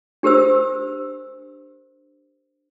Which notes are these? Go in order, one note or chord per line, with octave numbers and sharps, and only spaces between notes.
D4 G4 A#4 C5 E6